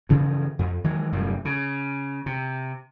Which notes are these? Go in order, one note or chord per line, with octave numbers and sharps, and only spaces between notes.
G2 C#3 E3 F3
F2
D#3 E3 F#3 G#3
F1 F#2 A2 G3
C#3
C3